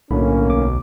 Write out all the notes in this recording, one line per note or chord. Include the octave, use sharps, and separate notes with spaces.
B1 A2 D3 A#3 C#4 B5
D2 D6